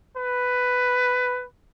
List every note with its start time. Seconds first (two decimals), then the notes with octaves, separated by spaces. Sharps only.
0.17 B4